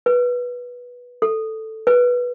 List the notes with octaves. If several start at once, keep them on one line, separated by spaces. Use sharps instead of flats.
B4
A4
B4